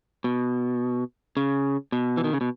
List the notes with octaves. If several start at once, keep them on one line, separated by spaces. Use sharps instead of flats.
B2
C#3
B2
E3
D#3
C#3
B2